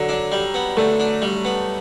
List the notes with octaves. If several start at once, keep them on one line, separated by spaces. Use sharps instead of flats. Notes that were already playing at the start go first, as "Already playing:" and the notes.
Already playing: D3 F#3
D4
G3
B3
D3 A3
D4
G3
B3